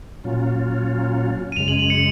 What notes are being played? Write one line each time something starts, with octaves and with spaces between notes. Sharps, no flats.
A#2 F#3 C#4 F4
D#7
F#2 C#3 G#3 F7
F#7
F7
C#7